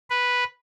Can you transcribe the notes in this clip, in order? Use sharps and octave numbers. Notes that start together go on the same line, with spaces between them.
B4